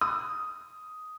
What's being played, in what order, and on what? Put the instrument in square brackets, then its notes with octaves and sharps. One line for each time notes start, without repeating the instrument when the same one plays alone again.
[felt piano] D#6